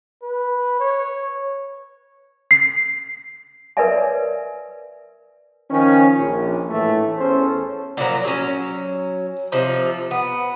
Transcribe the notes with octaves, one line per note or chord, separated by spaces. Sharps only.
B4
C#5
C7
A#4 B4 C#5 D5 E5 G#5
D#3 F3 C#4
A#1
A2 E3 A3
E2 C#4 A4 C5
A#2 F3 F#3 A#5
F#3 C#4
C3 F3 D#4
B3